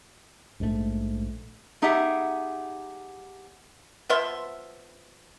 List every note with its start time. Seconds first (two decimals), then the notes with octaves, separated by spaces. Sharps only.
0.60 A#1 G#2 C#3 A3
1.82 B3 D#4 G4 G#4 E5 F#5
4.09 F3 B3 E5 C6